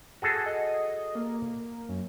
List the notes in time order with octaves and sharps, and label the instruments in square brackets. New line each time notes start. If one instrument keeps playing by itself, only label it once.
[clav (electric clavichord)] F#4 G#4 A4
[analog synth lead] D#5
A#3
F#2